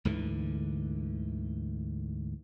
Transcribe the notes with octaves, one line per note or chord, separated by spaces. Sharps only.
D2 G#2 D3 E3